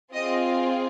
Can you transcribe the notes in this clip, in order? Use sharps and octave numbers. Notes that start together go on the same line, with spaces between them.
C4 F4 G#4 D#5